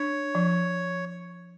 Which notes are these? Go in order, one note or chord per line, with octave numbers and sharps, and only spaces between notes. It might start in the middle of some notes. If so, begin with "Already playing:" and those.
Already playing: D4 C#5
F3